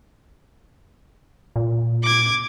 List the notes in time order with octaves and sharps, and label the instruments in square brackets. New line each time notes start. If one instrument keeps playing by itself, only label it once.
[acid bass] A#2
[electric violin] D6 G#6